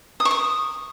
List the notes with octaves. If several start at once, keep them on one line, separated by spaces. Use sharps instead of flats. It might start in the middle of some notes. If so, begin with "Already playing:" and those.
D#6
C#6
D#6